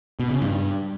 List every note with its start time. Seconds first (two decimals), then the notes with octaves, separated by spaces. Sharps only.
0.20 B2
0.31 C#3
0.42 G2